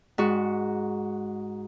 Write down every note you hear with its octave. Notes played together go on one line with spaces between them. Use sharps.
G#2 F#4